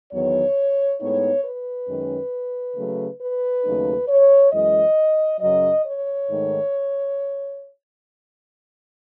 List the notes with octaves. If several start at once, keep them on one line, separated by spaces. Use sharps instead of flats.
E2 D#3 F#3 B3 C#5
A2 G#3 B3 D#4 C#5
B4
F#2 D#3 G#3 C#4
C#3 F#3 A3
B4
D#2 C#3 F#3 A3 D#4
C#5
F#2 E3 G#3 D#5
F#2 C#3 F#3 D#5
C#5
G#2 D#3 A3